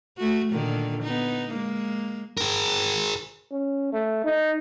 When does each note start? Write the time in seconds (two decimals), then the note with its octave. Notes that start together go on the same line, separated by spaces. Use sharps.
0.18 A3 F#4
0.51 A#2 D3 D#3
1.03 B3 D#4
1.50 G#3 A#3
2.37 G#4 A#4
3.51 C#4
3.93 A3
4.24 D#4